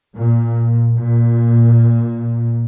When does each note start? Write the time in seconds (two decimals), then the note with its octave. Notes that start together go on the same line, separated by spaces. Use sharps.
0.15 A#2
0.97 A#2